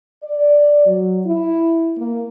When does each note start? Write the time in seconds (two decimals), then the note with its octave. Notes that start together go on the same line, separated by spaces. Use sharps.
0.23 D5
0.86 F#3
1.26 E4
1.98 A#3